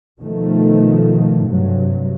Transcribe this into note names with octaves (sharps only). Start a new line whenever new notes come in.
B2 D#3 F3 A3
G2 C3 F#3